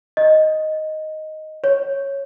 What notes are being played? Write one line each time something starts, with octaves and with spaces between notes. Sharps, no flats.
D#5
C#5